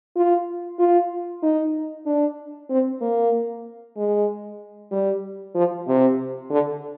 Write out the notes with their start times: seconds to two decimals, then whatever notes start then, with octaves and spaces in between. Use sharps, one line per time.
0.16 F4
0.79 F4
1.43 D#4
2.06 D4
2.70 C4
3.01 A#3
3.97 G#3
4.92 G3
5.55 F3
5.88 C3
6.50 D3